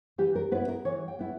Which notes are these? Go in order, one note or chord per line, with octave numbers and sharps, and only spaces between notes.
E3 G4
A#4
B3 E4 B4
A#4
E3 C#5
G5
B3 E4